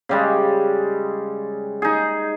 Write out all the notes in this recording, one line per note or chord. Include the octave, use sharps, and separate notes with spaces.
C#3 G3 G#3
D#4 G#4